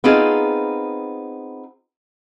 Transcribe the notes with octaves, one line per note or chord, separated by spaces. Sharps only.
B3 C4 D#4 F4 G#4